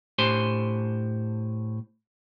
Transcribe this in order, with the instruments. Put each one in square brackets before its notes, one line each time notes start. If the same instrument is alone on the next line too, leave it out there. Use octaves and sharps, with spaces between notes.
[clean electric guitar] A2 D4 G4 C5 G#5 C6